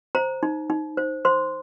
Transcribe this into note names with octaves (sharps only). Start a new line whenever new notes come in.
C5 A#5
D#4
D#4
C5
C5 C6